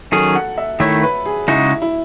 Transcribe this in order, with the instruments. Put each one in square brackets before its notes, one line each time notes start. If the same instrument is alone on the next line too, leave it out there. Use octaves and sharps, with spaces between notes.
[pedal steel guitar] D#3 F#3 C#4 G#4 [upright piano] A4
[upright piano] F#5
E5
[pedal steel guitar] D#3 A3 E4 [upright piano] C#5
[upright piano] B4
G#4
[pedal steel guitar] C#3 G#3 D#4 F#4 [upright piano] E4
[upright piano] E4